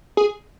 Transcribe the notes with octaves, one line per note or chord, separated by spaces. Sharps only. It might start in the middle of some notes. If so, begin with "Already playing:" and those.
G#4